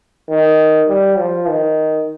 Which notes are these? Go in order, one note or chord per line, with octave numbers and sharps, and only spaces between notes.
D#3
G3
F3
D#3